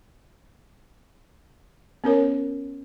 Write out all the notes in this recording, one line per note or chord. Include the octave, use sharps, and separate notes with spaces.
B3 C#4 A#4 C#5